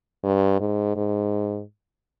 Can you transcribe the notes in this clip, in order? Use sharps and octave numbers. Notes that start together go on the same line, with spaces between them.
G2
G#2
G#2